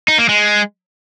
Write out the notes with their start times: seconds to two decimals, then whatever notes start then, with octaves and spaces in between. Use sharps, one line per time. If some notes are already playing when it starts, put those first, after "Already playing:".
0.08 D#4
0.18 A#3
0.29 G#3